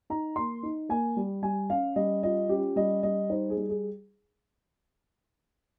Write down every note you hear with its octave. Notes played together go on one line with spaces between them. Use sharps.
D#4 A#5
A#3 C6
D#4
A#3 G#5
G3
G3 G#5
C#4 F5
G3 D#5
F4 D#5
C#4 G4
G3 D#5
G3 D#5
D#4 C5
G#4
G3
G#4